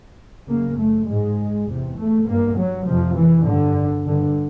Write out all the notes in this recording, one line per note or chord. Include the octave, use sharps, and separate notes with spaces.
F#2 C#3 A#3
A3
G#2 G#3
E2 C3
A3
G2 A#3
F#3
F2 C3 F3
E3
G2 D3
G2 D3